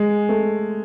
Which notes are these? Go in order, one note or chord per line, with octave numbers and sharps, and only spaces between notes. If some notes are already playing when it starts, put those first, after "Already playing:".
Already playing: G#3
A3